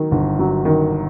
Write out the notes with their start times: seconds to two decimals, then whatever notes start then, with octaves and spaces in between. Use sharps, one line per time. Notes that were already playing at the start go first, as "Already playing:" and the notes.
Already playing: D#3 F#3
0.11 G1
0.39 F#3
0.65 D#3